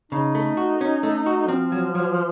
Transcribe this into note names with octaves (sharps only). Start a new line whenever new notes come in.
C#3 D#4
A3
F#4
C#4
A3
F#4
F3 C4
F#3
F#3